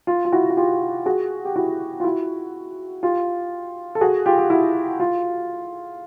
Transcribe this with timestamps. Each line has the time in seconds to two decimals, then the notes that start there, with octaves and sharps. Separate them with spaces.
0.07 F4
0.25 F4
0.33 E4 F#4
0.50 F#4
0.57 F4 G4
1.06 F#4 G#4
1.45 G4
1.56 E4 F#4
2.00 F4
2.04 E4 F#4
3.03 F4 G4
3.95 A4
4.01 F#4 G#4
4.26 F4 G4
4.39 G4
4.50 E4 F#4
5.00 F4